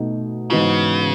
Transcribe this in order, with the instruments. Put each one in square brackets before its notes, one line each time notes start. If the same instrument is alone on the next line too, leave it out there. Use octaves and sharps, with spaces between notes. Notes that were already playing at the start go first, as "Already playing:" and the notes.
Already playing: [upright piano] B2 A3 D#4 F#4
[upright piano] G#2 E3 B3 D#4 F#4 [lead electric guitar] C#3